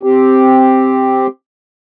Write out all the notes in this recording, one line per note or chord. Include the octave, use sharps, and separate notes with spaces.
C4 G4